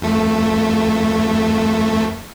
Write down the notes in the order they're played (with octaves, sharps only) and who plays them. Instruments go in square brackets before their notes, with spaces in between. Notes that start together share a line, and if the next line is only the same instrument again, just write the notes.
[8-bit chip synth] F2 A3